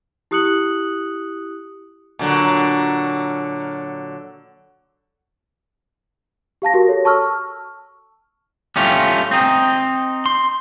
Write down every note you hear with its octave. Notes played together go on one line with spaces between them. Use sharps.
E4 G4 D#6 F#6 C#7 F#7
A#2 D3 F#3
G4 F5 A5 A#6
F#4 G4 A#4
A4 C#5
A5 C#6 E6 F6
G3 A3 C#4 F4
C4 D#4
C6